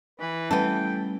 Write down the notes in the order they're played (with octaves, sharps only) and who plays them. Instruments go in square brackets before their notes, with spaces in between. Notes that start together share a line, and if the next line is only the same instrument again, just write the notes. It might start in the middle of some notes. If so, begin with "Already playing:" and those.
[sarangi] E3 [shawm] B4
[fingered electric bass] G3 A3 C#4 [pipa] B3 A4 [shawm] G5